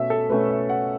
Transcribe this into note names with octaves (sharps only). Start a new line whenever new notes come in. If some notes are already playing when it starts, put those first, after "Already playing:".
Already playing: B2 A3 C#4 E5
A4
B2 A3 C#4 B4
E5
F#5